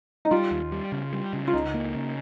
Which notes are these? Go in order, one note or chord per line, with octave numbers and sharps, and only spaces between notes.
D#4
G3 F4
D#2
G3
C#3
G3
C#3
F4
C#2 D#4
A#3
C#3